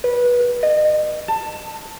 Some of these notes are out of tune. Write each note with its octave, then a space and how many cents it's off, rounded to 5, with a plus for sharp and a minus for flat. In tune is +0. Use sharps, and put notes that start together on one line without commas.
B4 -20
D#5 -35
A5 +15